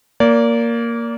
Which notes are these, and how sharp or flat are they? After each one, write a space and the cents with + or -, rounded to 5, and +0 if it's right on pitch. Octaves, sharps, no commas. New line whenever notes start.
A#3 +0 D5 -30